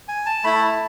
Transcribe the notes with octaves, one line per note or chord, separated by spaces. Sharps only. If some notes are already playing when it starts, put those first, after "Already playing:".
G#5
A5
A3 E4 B5
A5